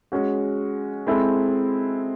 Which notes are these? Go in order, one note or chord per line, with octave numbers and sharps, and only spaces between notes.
G#3 C#4 F#4
G#3 C4 E4 A4